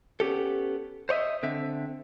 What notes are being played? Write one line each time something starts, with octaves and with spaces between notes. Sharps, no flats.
B3 C#4 G4 A4
C5 C#5 D#5 E5
D3 C4 E5